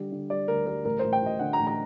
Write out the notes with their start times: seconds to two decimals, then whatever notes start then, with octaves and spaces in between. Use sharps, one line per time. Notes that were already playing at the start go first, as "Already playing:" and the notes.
Already playing: D3 G3
0.12 D3
0.30 G3 D5
0.48 D2 A#4
0.66 G3 A#4
0.85 A1 A#4
0.99 A1 C5
1.13 G5
1.22 A1 D#5
1.39 D3 F#5
1.53 A#5
1.59 A1
1.67 A#5